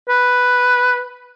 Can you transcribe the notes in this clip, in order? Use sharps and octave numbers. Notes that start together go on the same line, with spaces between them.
B4